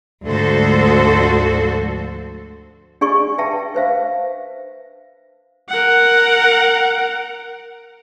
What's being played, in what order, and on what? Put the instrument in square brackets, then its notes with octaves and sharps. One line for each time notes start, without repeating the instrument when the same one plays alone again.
[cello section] D2 G#2 F3 F#4 A4 C5
[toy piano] D4 G#4 D5 D#5 G#5 C#6
B4 E5 G5 A5
B4 C5 E5 F5
[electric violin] A#4 F#5